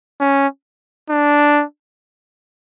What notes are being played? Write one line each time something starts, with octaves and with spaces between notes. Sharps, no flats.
C#4
D4